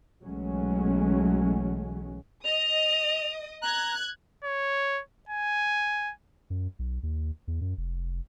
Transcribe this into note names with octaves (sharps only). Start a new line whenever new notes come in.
B1 E3 F#3 G#3 A3 C#4
D#5 D#6 F7
A#5 F#6 G#6
C#5
G#5
F#2
B1
D#2
E2
F#2
F1